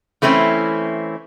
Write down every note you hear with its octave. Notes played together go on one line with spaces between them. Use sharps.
E3 A3 C4 C#4 E4